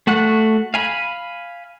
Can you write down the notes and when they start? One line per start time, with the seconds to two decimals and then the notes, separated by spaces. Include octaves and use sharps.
0.07 A3 F#4 F#5 F#6
0.74 F5 G#5 B5